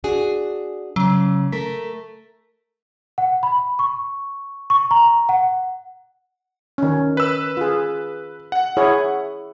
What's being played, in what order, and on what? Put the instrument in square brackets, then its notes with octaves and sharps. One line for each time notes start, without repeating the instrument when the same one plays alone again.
[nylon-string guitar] D4 F#4 G#4
[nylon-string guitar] C#3 [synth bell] F#3
[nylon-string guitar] A3 A#4 [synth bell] B6
[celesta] F#5
B5
C#6
C#6
A#5
F#5
[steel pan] D#3 C#4
[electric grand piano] B4 E6
[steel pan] F4 G#4
[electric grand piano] F#5
[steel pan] E4 G#4 C#5